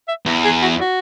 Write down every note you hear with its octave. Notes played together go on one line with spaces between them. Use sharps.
E5
E2
G#4
F#4
F#4